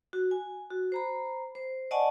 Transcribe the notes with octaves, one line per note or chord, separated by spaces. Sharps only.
F#4
G#5
F#4
C5 A#5 B5
C5
D5 D#5 F#5 G#5 A5 C#6